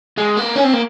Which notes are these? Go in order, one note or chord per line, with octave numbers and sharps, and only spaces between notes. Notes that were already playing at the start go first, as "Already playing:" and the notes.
G#3
A#3
C#4
C4
A#3